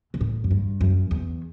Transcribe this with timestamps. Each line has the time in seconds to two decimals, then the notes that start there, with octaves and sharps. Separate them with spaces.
0.14 B2
0.21 A2
0.44 F#2
0.51 G2
0.81 F#2
1.11 E2